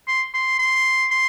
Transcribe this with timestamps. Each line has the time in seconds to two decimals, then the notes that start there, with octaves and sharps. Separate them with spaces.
0.08 C6
0.34 C6
0.59 C6
1.11 C6